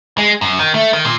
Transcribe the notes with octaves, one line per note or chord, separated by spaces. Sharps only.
G#3
F#2
D#3
A3
D#3
A#2